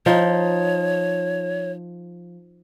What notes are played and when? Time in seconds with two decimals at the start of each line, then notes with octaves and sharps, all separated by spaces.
0.06 F3 D#4 C#5